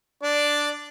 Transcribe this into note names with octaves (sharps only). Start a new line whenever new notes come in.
D4 D5